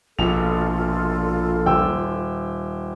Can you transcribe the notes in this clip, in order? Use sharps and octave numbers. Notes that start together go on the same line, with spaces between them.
A#1 B2 F4 A4 F7
D#1 G5 E6